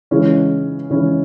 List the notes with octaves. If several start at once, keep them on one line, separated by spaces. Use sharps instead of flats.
C#3 E3 G#3 C#4 E4
C#3 E3 G#3 C#4 E4